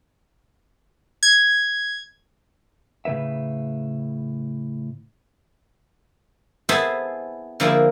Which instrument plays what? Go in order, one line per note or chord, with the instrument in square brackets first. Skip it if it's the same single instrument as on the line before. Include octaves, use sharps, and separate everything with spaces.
[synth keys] G#6
[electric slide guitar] A2 C#3 G3 B4 E5
[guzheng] B3 E4 G#4 A4 C5
D3 F3 A#3 E4 G#4